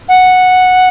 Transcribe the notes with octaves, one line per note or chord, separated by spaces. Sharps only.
F#5